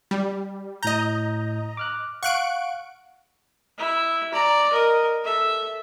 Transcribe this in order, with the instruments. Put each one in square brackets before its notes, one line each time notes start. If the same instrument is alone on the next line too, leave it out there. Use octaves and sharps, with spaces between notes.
[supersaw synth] G3
[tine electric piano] A2 G6 [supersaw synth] D#5 A#5
[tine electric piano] D6 F6 F#6
[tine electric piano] F5 F#5 [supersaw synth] C#6 F#6 D7
[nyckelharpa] E4 E5
D5 A#5
A#4 D#5
A4 E5